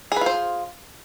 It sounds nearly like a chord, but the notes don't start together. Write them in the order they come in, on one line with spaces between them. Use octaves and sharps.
G#4 B4 F4 C5